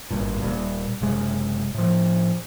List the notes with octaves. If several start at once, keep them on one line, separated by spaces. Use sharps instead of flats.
G#1 G2 A#2
D#1 A#2 G3
F#1 C3 G#3
A2 F3